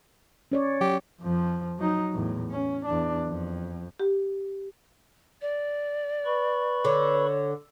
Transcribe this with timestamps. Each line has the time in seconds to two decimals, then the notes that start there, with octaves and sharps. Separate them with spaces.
0.52 C#4 C#5 D5
0.81 F#3 G4
1.21 F2 F3
1.79 F#3 D#4
2.13 E2 A2
2.50 C#4
2.85 E2 D4
3.26 F2
4.00 G4
5.41 D5
6.26 B4 B5 C#6
6.85 D3 C#5